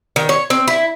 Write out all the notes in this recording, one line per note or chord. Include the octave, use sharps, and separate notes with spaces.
D#3
C#5
C4
E4